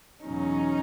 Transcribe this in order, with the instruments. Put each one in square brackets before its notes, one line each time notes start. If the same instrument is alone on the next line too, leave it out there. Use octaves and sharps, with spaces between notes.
[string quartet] E2 B2 F#3 C#4 D#4